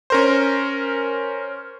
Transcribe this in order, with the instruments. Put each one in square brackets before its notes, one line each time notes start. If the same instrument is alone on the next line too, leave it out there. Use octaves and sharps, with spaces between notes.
[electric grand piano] C#4 A#4 C5